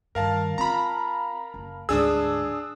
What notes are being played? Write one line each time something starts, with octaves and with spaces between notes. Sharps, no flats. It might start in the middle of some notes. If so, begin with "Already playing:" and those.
G2 D#3 A#4 F5 A5
C4 F4 A#5 B5
F#1
D2 G#2 D4 G#4 D#6 E6